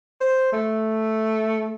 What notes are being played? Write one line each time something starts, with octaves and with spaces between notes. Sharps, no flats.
C5
A3